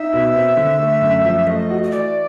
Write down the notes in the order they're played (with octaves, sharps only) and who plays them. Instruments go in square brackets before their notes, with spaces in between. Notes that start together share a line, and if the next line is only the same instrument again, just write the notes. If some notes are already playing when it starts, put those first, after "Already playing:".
Already playing: [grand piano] D#4 [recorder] E5
[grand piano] B2
C4
D3
A3
F#2
F3
[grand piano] A3 [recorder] D#5
[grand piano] F#4
[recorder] D#5
[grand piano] E3 [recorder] D5